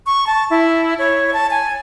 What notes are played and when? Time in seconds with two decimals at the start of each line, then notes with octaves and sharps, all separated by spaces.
0.06 C#6
0.27 A5
0.50 E4
0.99 C#5
1.33 A5
1.51 G#5